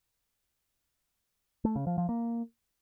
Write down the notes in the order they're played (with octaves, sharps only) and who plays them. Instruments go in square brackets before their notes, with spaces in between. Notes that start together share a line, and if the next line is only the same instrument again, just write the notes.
[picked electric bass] A3
C#3
F3
F3
A#3